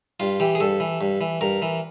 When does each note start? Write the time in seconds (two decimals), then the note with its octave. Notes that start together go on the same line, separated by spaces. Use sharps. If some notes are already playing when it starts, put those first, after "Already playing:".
0.20 G2 F4
0.40 E3 G4
0.55 G#4
0.60 G2 A4
0.80 E3
1.01 G2
1.21 E3
1.41 G2 A#4
1.62 E3